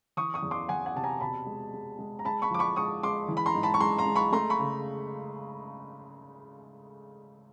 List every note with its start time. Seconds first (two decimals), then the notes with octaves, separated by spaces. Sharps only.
0.17 E3 C#6 D#6
0.34 C#6 D#6
0.43 E2
0.51 C6 D6
0.69 E2 F#5 G#5
0.86 F#5 G#5
0.96 C3 A5
1.04 G#5 A#5
1.21 B2 A5 B5
1.46 G#3
1.74 G#3
1.99 G#3
2.19 A#5
2.25 G#3 A5 B5
2.42 B5 C#6
2.51 F3 D6
2.59 B5 C#6
2.76 G#3 C#6 D#6
3.03 G#3 C6 D6
3.28 E3
3.37 B5
3.46 A#5 C6
3.55 G#2
3.63 A5 B5
3.74 C#6
3.80 G#3 A#5 C6
3.98 A#5 C6
4.06 G#3
4.16 B5 C#6
4.32 A3 A#5 C6
4.50 B5 C#6
4.59 C#3